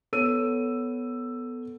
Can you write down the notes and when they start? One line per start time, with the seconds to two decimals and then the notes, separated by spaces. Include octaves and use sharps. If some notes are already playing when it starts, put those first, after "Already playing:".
0.13 B3 A4 C#5 E6 D#7